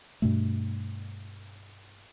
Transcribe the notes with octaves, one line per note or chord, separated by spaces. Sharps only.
G2 B2 A3